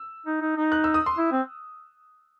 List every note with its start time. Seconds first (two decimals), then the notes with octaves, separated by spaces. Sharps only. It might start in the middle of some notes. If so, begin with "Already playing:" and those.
Already playing: E6
0.26 D#4
0.41 D#4
0.57 D#4
0.72 F#6
0.84 E6
0.94 D#6
1.06 C6
1.17 E4
1.32 C4